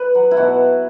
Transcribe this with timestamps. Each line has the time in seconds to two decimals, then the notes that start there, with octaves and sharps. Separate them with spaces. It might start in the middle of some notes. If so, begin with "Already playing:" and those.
Already playing: B4
0.15 F#3
0.31 E4
0.37 B2 F#4